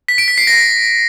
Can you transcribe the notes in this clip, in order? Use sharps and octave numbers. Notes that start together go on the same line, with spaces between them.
B6
D7
B6
C7
A#6